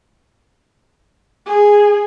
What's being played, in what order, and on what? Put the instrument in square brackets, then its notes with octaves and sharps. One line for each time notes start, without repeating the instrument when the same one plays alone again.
[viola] G#4